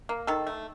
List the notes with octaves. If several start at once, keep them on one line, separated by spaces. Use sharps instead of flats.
A#3
D#3 A4
A3